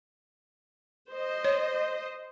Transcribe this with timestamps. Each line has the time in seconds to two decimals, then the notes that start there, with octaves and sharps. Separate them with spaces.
1.10 C5 D#5
1.45 C#5